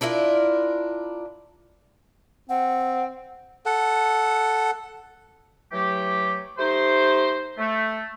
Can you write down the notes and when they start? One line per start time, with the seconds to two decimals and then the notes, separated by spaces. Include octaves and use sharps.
0.01 D4 E4 F4 A#4
2.49 C4 F#5
3.66 A4 F#5
5.72 E3 F#3 A3 G4
6.58 A3 D#4 G4 C5
7.58 A3